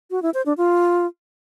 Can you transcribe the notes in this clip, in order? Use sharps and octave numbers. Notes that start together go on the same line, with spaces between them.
F#4
E4
C5
D4
F4